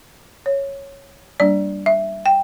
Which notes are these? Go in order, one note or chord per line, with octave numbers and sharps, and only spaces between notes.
C#5
G3 A#3 D4 D5
E5
G5